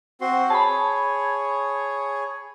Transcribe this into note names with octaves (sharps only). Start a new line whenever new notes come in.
C4 F#4 C6
G#4 C#5 A5 B5